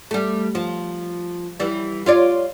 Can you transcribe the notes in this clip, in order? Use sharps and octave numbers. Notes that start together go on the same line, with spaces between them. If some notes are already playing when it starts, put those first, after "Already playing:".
G3 A3
F3
E3 G3
F4 C#5 D5